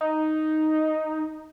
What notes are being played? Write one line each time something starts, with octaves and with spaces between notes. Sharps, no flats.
D#4